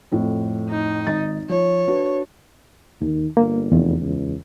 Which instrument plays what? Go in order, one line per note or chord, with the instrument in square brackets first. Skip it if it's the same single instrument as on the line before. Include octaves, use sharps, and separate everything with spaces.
[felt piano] F2 A2
[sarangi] D#4
[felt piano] G#1 D#5 A6
[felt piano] F3 [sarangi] C#5
[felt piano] D4 F#4 B4
[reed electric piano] D#2 [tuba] D#3
[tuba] G1 [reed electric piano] A#3
[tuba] F1 [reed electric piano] E2
[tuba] C#2